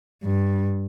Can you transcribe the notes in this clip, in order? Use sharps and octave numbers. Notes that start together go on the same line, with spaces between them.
G2